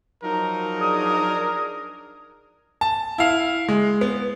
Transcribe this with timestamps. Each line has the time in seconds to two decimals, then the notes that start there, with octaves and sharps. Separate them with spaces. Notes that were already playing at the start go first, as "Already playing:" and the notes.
0.23 F3 F#3 D#4 A#4
0.79 D4 G#4 D#6
2.81 A5
3.18 E4 F5
3.69 G#3
4.01 B3